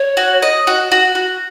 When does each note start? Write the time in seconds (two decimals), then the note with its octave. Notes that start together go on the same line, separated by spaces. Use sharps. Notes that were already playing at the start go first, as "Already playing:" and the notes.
Already playing: C#5
0.17 F#4
0.42 D#5
0.67 F#4
0.92 F#4
1.15 F#4